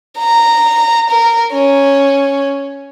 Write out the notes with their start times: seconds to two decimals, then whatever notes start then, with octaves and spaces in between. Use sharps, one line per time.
0.19 A#5
1.10 A#4
1.52 C#4